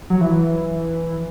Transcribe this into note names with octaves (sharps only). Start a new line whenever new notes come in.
F#3
E3